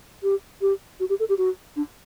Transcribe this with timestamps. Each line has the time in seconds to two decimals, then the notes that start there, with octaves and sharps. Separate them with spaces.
0.23 G4
0.61 G4
1.00 F#4
1.09 G4
1.19 A4
1.29 G4
1.38 F#4
1.76 D4